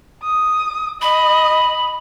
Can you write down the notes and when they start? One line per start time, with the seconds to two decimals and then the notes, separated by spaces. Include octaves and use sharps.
0.23 D#6
1.02 D#5 B5